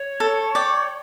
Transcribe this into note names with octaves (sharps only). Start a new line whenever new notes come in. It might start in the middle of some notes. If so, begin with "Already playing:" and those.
Already playing: C#5
A4
D5 G5